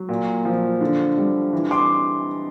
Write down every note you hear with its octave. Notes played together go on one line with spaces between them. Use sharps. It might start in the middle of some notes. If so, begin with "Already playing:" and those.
Already playing: F#3
A#2
F3
D3
G3
E3
C6 D6